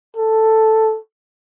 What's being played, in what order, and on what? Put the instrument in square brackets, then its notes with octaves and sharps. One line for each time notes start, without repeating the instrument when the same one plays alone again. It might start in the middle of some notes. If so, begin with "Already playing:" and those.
[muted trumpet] A4